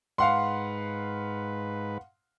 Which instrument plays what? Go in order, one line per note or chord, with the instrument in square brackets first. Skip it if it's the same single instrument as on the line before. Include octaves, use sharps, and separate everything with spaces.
[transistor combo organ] G#2 B4 [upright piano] F5 F#5 C6